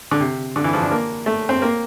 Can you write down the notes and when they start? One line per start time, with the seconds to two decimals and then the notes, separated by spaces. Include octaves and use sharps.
0.11 D3
0.20 C3
0.56 D3
0.64 E3
0.73 F3
0.82 D4
0.91 A#3
1.26 A3
1.49 C4
1.62 A#3